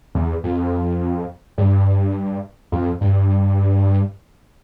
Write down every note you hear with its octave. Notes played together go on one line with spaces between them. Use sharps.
E2
F2
G2
F2
G2